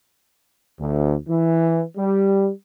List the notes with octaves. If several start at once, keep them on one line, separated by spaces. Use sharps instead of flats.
D2
E3
G3